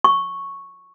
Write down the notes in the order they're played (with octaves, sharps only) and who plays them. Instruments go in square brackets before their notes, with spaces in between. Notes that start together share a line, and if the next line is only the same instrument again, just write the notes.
[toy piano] C#6